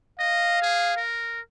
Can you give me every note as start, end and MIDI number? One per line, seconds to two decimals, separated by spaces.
0.19 0.58 75
0.19 1.01 77
0.62 0.95 68
0.97 1.40 70